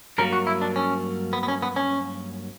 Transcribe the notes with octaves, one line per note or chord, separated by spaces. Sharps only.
G2 F#3 A#3 A#4
F#4
E4
D4
C#4
B3
B3
C#4
B3
C#4